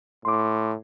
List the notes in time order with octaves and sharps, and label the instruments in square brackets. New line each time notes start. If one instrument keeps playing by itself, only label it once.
[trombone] A2 [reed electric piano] C6 D6